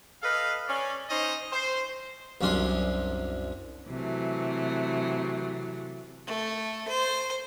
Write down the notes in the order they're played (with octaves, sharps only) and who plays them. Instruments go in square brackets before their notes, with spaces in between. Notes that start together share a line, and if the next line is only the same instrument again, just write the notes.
[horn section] A4 B4 D#5 F5
C#4 D5
C#4 D#4 C5 D#5
C5
[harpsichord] C2 F#2 C#4 D4 C6
[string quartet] C3 E3 F#3 A3
[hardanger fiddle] A3
C5